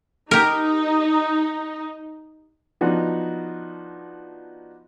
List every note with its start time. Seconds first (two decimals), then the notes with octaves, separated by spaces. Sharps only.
0.31 D#4 G4 A#4
2.81 F3 B3 D4 D#4 F#4